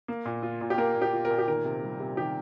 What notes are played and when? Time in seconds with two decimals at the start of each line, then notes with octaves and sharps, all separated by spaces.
0.08 A#3
0.25 A#2
0.43 F4
0.61 A#2
0.70 G4
0.78 A#3 A#4
0.95 A#2
1.02 G4
1.13 F4
1.25 A#4
1.30 A#2
1.38 G4
1.48 D#3 A#4
1.65 C3
1.83 G3
2.00 C3
2.17 D#3 G4